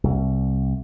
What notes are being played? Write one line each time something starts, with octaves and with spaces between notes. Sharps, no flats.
C2